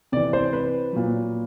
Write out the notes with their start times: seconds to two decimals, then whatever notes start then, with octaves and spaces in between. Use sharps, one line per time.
0.12 C3 E3 D5
0.33 C5
0.53 B4
0.93 A#2 F#3